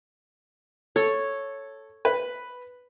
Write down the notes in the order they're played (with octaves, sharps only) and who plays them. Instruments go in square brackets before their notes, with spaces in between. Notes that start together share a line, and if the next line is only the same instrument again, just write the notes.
[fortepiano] A4 [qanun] C#5
[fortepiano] B4